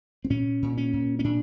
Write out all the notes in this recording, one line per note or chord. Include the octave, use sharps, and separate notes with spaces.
C4
A#2 C#4
A#2
C#4
A#2
C#4
A#2 D4